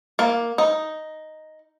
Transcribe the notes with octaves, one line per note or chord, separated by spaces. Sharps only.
A#3
D#4